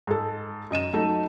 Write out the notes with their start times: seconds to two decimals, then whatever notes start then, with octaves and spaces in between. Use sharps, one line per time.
0.07 G#2 A4
0.71 F#2 D#5 D#7 E7
0.93 F#3 A3 D#4